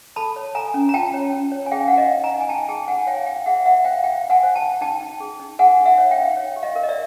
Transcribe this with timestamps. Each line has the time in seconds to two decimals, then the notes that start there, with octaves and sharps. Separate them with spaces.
0.16 A4 A5 B5
0.36 C#5
0.55 A4 G#5 A#5
0.74 C#4
0.89 A#5
0.94 F4 G5 A5
1.14 C#5
1.33 C#4
1.52 C#5
1.66 G#5
1.71 G#4 F5 G5
1.88 D#4 F#5
1.97 D#5 F5
2.11 D#4
2.24 G#5 A#5
2.30 D#4
2.41 G#5
2.49 D#4 G5 A5
2.69 G#4 G5 A5
2.88 D#4 F#5 G#5
3.07 C#5 F5 G5
3.26 E4 F5 G5
3.46 G#4 E5 F#5
3.65 E4 E5 F#5
3.84 C5 F5 G5
4.04 E4 F5 G5
4.24 E4
4.30 F#5 G#5
4.43 C5
4.55 G5 A5
4.63 E4
4.81 D#4 G5 A5
5.01 D#4
5.20 G#4
5.40 D#4
5.59 G#4 F#5 G#5
5.79 D#4
5.85 E5 F#5
5.98 C#5
6.11 F5 G5
6.18 D#4
6.37 C#5
6.56 G4
6.63 D#5 F5
6.75 A#4
6.83 D#5
6.89 D5 E5